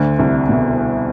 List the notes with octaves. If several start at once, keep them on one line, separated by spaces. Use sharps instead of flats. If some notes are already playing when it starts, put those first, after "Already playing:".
Already playing: D2 D3
C2 C3
B2